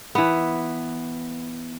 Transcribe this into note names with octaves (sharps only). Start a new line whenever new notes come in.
E3 B3